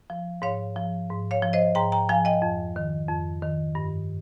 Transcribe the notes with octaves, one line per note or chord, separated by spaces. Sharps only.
F3
G#2 C#5 F5
F3
G#2
C#5 F5
F3
C5 D#5
G#2 G5 A#5
G5 A#5
F3 F5 G#5
D#5 G5
F2
D#3
F2
D#3
G2